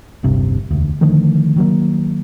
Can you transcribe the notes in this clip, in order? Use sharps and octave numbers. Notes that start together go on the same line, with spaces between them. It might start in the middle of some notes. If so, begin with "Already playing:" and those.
D1 G1 G2 C3
E1 D2
D3 D#3 F3 A3
D#3 F#3 A#3